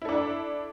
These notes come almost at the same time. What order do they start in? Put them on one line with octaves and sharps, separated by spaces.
E4 A4 D4